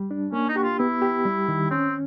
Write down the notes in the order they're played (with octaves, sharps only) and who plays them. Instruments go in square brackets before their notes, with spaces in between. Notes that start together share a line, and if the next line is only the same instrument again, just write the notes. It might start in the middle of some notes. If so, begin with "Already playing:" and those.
Already playing: [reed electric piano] G3
D4
[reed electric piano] A#3 [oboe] C#4
[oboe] D#4
[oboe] F#4 [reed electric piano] G4
[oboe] F4
[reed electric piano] B3 [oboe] E4
[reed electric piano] G4
G3
D#3
[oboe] C4 [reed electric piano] C#4